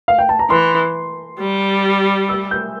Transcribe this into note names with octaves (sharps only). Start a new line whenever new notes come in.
F5
G5
A5
A#5
E3 C6
G3
E6
G6